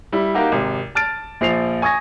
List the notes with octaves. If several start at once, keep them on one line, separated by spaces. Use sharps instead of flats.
G3 E4
A#3 D#4 F#4 G4
G#1 C3
A5 F6 A6 D7
A#1 F3 C7 F7
G#5 C#6 D#6 G#6 A#6